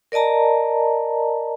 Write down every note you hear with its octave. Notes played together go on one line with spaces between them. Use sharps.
A#4 D5 D#5 A5 A#5